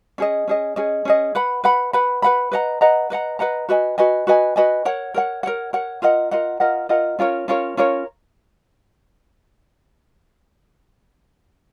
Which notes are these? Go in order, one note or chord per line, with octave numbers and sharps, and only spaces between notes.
C#4 G#4 D#5
C#4 G#4 D#5
C#4 G#4 D#5
C#4 G#4 D#5
B4 F#5 B5
B4 F#5 B5
B4 F#5 B5
B4 F#5 B5
B4 D#5 F#5 A#5
B4 D#5 F#5 A#5
B4 D#5 F#5 A#5
B4 D#5 F#5 A#5
F#4 B4 D#5 G#5
F#4 B4 D#5 G#5
F#4 B4 D#5 G#5
F#4 B4 D#5 G#5
A#4 C#5 F#5
A#4 C#5 F#5
A#4 C#5 F#5
A#4 C#5 F#5
F4 A#4 D#5 F#5
F4 A#4 D#5 F#5
F4 A#4 D#5 F#5
F4 A#4 D#5 F#5
C#4 F4 A#4 C#5
C#4 F4 A#4 C#5
C#4 F4 A#4 C#5